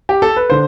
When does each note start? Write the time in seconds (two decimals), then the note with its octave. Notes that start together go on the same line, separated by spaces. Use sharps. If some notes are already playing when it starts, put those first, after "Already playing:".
0.09 G4
0.22 A4
0.36 B4
0.50 D3 C5